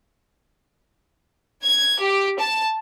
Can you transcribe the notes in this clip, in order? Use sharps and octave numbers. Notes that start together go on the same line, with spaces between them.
G#6
G4
A5